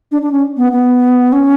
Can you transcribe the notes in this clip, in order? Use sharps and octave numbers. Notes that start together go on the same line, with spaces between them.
D4
D4
C#4
B3
B3
C#4